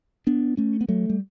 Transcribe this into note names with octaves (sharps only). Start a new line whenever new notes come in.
B3 D4
A3 C#4
B3
F#3 A3
G3